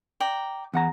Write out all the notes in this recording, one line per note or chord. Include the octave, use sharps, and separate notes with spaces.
D5 G5 A#5
E2 F#5 A#5